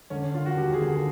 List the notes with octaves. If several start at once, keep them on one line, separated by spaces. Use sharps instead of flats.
D3 C#4
D3 F4
F#4
D#2 G4
G#4
D3
G#4